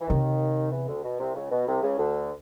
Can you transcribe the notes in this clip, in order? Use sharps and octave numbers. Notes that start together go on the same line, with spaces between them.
E3
D#2 C3 D#3
E2 E3
D2 D3
B2
C2 C3
C#2 C#3
B2
C2 C3
C#2 C#3
D2 D3